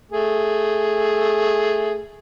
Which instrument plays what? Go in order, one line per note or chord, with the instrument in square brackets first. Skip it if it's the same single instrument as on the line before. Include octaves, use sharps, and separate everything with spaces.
[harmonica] A3 G#4